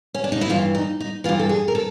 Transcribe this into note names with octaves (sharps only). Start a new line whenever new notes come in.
C#4
D4
D#4
E4
G2 E3 F4
D#4
D#4
G2 E3 F4
A4
G#4
A#4
A4